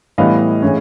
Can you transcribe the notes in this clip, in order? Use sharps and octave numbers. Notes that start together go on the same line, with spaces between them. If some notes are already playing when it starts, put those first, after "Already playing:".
A2 E3 G3 B3 D#5 F5
A2 E3 G#3 C#4